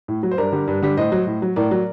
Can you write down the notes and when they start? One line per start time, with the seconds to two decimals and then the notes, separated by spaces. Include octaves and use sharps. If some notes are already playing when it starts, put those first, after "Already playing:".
0.08 A2
0.23 F#3
0.31 C5
0.38 G2 A#4 D5
0.52 D3 G3
0.68 G2
0.82 D3 G3
0.97 A2 C5 D#5
1.12 F#3
1.27 A2
1.42 F#3
1.56 A2 A#4 D5
1.71 F#3